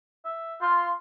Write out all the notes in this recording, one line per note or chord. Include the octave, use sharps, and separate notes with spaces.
E5
F4 C6